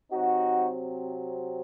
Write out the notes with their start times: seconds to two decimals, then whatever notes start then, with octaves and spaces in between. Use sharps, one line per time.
0.12 C3 F#3 C4 D#4 F#4